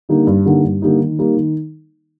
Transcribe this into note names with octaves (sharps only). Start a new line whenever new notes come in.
D3 G3 A#3 D#4
G2
D3 G3 A#3 D#4
G2
D3 G3 A#3 D#4
D#3
G3 A#3 D#4
D#3